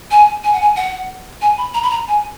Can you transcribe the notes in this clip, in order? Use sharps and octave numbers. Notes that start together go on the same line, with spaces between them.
G#5
G#5
F#5
G#5
F#5
G#5
B5
A#5
B5
A#5
G#5